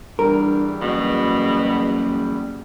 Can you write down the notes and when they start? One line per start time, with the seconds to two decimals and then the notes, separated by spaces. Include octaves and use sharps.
0.19 E2 G2 G3 A#4
0.82 F#1 B2